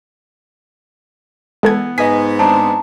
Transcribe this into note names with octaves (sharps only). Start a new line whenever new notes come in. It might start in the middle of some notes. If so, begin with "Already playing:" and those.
E3 G#3 B3 A4 G#6
G#2 B3 D#5 G#5 B6
G#3 C4 D4 A5 A#5